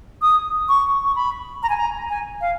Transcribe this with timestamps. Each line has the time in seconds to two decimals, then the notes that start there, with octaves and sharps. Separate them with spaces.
0.22 D#6
0.69 C#6
1.04 C#6
1.16 B5
1.63 A#5
1.69 G#5
1.77 A#5
2.10 G#5
2.41 F5